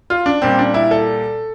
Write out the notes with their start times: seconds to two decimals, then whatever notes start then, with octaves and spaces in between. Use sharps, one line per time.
0.10 F4
0.26 D4
0.42 A#2 G3 C4
0.59 D4
0.74 E4
0.91 A4